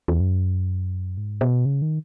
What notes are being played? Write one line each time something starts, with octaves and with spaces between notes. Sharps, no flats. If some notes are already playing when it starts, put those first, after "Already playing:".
E2
F#2
G#2
B2
C#3
D#3